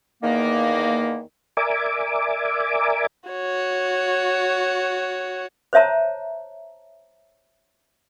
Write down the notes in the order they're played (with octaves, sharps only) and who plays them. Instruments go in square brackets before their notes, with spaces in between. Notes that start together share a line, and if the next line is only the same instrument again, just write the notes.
[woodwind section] E2 D#3 A#3
[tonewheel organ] A#4 D5 E5 G#5 D6
[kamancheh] F#4 C#5
[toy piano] C5 C#5 E5 A5 A#5